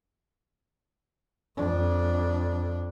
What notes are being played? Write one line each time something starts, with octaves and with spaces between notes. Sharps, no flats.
F2 D4